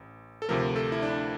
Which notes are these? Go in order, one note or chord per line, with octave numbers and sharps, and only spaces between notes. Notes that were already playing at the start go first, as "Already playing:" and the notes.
Already playing: A1
A4
D2 C3 F3 A3 A#4
A4
E4
D4